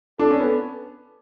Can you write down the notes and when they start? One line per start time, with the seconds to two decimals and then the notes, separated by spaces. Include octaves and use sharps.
0.19 D4 A4
0.31 C#4
0.40 B3